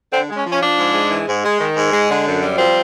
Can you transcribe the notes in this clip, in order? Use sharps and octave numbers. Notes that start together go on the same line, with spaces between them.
D3 C4
G#3
C#4
F3
C#4
F3 D4
G#2
G#3
E3
G#2
G#3
D#3
G#2
G#3
D3
F#2
G3
F3 C4